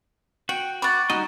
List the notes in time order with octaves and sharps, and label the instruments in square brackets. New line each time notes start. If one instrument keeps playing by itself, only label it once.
[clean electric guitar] F#4 [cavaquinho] G5
[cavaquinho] D5 F#5 [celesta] B5 C#6 A6
[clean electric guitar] G3 D#4 D#5 [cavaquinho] F#4